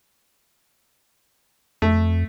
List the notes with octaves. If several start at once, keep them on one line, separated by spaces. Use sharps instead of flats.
F2 A3